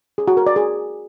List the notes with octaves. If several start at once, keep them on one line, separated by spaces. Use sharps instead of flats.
G#4
F#4
A#4
D5
G#4